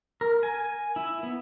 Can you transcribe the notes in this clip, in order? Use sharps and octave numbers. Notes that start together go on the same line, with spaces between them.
A#4
G#5
E4
B3